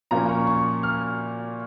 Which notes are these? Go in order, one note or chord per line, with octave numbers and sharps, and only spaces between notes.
A#2 F3 A#3 C#4 A#5
C#6
C#6
F6